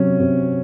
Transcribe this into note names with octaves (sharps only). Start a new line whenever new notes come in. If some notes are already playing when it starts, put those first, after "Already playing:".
Already playing: C3 F#3 C#4
C3